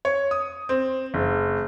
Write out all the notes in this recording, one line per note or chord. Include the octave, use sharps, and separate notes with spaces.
C#5
D#6
C4
F#1